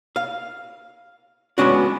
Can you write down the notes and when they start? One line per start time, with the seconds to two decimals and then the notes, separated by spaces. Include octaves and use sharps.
0.16 F5
1.58 G#3 B3 C#4 D4 F#4